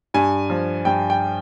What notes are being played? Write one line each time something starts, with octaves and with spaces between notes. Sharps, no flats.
G2 G#5
F3
G2 G5
G5